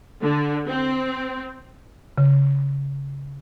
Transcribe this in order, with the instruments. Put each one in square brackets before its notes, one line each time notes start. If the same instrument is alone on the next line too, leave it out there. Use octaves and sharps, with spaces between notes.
[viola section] D3
C4
[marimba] C#3